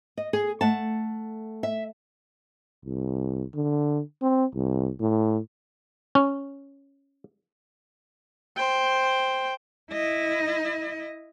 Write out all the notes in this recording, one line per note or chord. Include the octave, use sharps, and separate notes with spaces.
D#5
G#4
A3 F#5 A5
E5
C2
D3
C4
C2
A2
C#4
C5 G5
E4 D#5